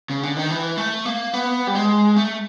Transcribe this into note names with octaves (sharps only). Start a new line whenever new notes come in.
C#3
D3
D#3
E3
A3
A#3
B3
G3
G#3
A3